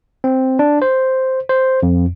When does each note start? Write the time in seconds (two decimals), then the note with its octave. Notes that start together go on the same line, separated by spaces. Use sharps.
0.24 C4
0.59 D4
0.82 C5
1.49 C5
1.83 F2